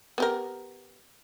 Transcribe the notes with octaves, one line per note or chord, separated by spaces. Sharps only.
B3 G4 A#4